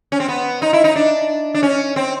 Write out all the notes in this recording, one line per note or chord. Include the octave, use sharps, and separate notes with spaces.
C#4
C4
B3
D#4
E4
D#4
D4
D4
C#4
C4